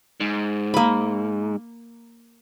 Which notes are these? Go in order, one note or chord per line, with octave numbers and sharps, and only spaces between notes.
G#2
A#3 B5